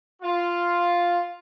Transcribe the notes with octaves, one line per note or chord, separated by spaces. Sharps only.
F4